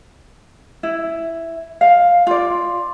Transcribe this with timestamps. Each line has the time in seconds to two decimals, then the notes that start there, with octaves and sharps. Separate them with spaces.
0.83 E4
1.81 F5
2.27 F4 D5